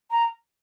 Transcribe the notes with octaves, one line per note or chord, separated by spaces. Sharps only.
A#5